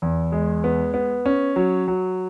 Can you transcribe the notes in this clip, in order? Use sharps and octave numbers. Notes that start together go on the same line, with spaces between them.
E2
G#3
B3
B3
C#4
F#3
F#3